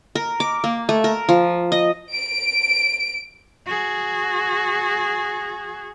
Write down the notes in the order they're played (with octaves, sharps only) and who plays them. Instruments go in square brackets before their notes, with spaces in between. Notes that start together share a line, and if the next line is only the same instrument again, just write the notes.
[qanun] A#4
D6
A#3
A3
A#4
F3
D#5
[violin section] D7
[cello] F#4 G#4